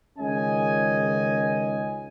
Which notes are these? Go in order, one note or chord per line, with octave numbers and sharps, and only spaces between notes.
C#2 D#3 C#4 D#5 G#5